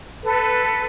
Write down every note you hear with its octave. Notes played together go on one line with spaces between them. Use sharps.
A4 B4